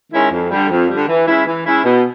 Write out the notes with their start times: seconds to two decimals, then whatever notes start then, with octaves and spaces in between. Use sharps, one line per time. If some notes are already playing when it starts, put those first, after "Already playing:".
0.13 D#3 G#3 C#4 E4
0.31 F2
0.51 D3 G3
0.70 F2
0.89 D3 G3
1.08 E3
1.28 G#3 C#4 E4
1.46 E3
1.66 G#3 C#4 E4
1.85 B2